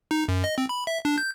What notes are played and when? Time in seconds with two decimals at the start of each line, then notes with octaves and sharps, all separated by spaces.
0.11 D#4
0.28 F#2
0.44 D#5
0.58 C4
0.69 B5
0.87 E5
1.05 D4
1.18 G6